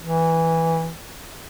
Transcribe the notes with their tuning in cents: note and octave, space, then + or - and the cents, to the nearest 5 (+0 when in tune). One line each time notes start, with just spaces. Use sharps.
E3 -10